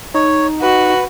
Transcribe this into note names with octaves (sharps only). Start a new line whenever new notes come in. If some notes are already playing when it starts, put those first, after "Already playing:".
D#4 C#5
F#4 B4